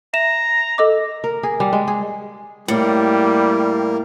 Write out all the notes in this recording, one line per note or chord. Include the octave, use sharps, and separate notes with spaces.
E5 A#5 E7
A4 D#5 D6
A#4
G#4
G3
G#3
G#4
A2 G3 A#3